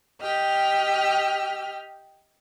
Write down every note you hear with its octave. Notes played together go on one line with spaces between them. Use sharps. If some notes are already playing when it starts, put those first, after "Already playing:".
G4 D#5 G5 F6